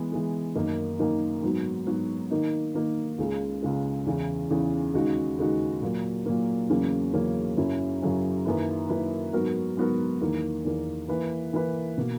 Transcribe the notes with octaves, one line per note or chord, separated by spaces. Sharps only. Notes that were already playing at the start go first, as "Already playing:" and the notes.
Already playing: E3 G#3 B3
E3 G#3 B3
F#2 D#3 A#3 D#4
F#2 D#3 A#3 D#4
G#2 F#3 B3 F#4
G#2 F#3 B3 F#4
D#3 A#3 D#4
D#3 A#3 D#4
C#2 C#3 G#3
C#2 C#3 G#3
E2 C#3 E3
E2 C#3 E3
D#2 C#3 G#3 D#4 F#4
D#2 C#3 G#3 D#4 F#4
A#2 F#3 A#3
A#2 F#3 A#3
E2 C#3 F#3 A#3 C#4
E2 C#3 F#3 A#3 C#4
F#2 C#3 F#3 C#4 E4
F#2 C#3 F#3 C#4 E4
F#2 D#3 A#3 E4 B4
F#2 D#3 A#3 E4 B4
G#2 F#3 B3 F#4 A#4
G#2 F#3 B3 F#4 A#4
E2 D#3 A#3
E2 D#3 A#3
E3 A#3 E4 B4
E3 A#3 E4 B4
B2 A#3